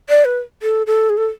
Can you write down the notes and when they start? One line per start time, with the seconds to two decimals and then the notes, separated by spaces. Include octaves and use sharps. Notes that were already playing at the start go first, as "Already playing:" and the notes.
0.09 D5
0.25 B4
0.62 A4
0.87 A4
1.09 G#4
1.17 A4